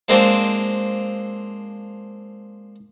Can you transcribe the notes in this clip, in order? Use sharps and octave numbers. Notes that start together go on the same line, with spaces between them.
F3 G#3 A#3 C4 D4